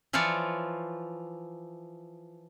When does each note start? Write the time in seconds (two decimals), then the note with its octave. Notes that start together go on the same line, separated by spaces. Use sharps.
0.13 E3 F3 F4 C#5 D5